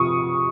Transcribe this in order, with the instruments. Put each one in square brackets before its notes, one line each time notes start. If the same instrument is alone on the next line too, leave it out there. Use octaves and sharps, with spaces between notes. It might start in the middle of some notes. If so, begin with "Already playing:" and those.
Already playing: [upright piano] C3 F3 C#6 D#6